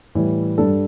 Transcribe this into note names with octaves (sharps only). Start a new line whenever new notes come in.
A2 E3 G3
G2 G3 D4 A4